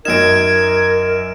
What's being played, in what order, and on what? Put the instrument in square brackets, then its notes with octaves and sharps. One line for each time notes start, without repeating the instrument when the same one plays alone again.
[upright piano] F#2 D#4 [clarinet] A#4 [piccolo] G#6 [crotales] D7 E7